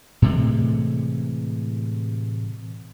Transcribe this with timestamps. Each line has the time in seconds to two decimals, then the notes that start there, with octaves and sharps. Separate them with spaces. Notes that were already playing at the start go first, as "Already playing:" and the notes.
0.22 A2 C3 E3 G#3